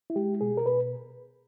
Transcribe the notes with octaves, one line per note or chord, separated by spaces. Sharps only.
E4
G#3 G4
B2 G#4
A#4
B2 B4